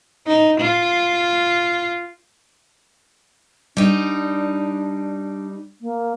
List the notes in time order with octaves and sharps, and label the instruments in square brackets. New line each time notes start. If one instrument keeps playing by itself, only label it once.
[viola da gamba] D#4
F4
[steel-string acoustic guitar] G3 D#4 [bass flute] D4
[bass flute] A#3